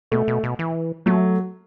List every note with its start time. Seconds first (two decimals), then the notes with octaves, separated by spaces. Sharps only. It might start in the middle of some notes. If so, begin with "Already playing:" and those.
0.12 B2 A3
0.28 B2
0.43 B2
0.59 E3
1.06 F#3 A3